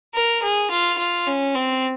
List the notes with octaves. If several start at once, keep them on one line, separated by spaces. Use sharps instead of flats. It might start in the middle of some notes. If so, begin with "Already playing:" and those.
A#4
G#4
F4
F4
C#4
C4